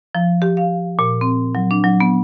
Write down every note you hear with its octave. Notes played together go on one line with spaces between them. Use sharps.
F3
G4
F5
A#2
C4
F#3
D4
F#3
B3